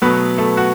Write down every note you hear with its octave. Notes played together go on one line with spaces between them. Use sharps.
B2 F#3 A3 B3 B4
A3 A4
F#4